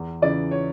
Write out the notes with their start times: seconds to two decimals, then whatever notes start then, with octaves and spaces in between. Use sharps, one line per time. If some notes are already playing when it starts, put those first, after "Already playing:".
Already playing: E2
0.22 C#3 E3 D5
0.51 C#5